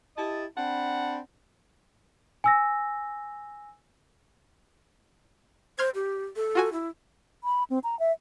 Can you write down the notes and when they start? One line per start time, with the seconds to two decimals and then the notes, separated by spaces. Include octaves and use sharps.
0.17 E4 G4 D#5 A5
0.57 C4 D4 F#5 A5 B5
2.44 G#5 E6 A#6
5.79 C5 C6 F6 G#6
5.95 G4
6.36 A4
6.55 F4 F#4 G#5
6.73 E4
7.44 B5
7.70 C4
7.84 A#5
8.00 E5